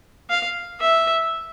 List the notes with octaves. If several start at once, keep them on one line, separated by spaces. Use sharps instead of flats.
F5
E5